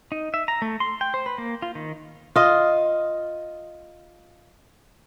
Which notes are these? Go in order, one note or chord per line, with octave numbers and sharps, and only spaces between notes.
D#4
E5
A#5
A3
C6
G5
C5
B4
A#3
F4
D#3
F4 D#5